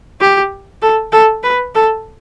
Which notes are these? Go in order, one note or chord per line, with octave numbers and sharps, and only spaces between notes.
G4
A4
A4
B4
A4